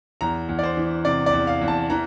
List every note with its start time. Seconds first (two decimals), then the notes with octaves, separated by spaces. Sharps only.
0.21 E2 A#5
0.49 E2
0.59 D5
0.63 C5
0.77 E3
1.05 C3 D5
1.26 D5
1.33 E2
1.47 F5
1.61 E2
1.68 A5
1.90 E3 A#5